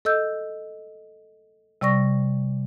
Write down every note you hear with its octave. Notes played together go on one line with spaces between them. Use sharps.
A4 D#5 E6 G6
C3 G3 D5 C#6 A#6